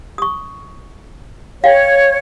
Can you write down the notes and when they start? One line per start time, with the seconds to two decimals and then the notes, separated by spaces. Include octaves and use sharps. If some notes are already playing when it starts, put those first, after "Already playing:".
0.18 C#6 D#6
1.64 C#5 F5 G5